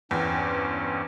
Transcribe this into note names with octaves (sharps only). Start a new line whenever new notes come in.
E2 G2 C4 C#4